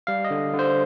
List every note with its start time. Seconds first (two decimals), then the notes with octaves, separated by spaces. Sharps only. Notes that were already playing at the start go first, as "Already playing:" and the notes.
0.07 G3 F5
0.25 D#5
0.30 D3
0.54 D3
0.59 C5